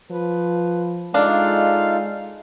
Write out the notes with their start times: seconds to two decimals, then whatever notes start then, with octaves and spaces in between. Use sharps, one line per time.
0.11 F3 B4
1.14 G#3 D4 D#4 F4 A4 F5